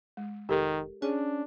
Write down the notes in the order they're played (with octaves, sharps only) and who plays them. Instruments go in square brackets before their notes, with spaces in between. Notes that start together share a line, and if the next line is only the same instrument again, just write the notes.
[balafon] G#3
[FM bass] F1 [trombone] D#3 [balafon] G4 A4 A#4
[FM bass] C#4 [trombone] D4 [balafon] G#4